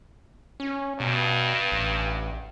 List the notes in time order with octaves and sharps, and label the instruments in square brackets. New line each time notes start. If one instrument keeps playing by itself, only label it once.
[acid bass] C#4
[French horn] G2 [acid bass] B2
[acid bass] A1